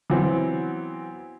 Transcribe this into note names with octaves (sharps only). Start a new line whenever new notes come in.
E3 F#3 B3 C4